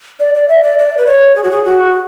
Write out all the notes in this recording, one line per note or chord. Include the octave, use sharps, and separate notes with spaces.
D5
D5
E5
D5
D5
B4
C#5
G#4
F#4
G#4
F#4